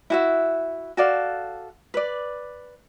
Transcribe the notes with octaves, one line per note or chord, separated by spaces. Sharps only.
E4 F#4 E5
F#4 A4 D5 F5
B4 D5